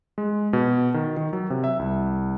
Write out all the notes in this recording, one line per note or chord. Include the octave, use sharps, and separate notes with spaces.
G#3
B2
D#3
D#3
F#3
C3
E5
C2